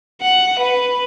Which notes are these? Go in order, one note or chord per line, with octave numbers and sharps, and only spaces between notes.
F#5
B4